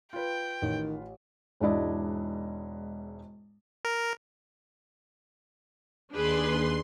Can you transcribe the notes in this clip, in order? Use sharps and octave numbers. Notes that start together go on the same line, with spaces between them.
F4 B4 G5
A1 D#3
E1 G#2 D4 E4 D5 D#5
A#4
D#2 D4 G#4 B4 C6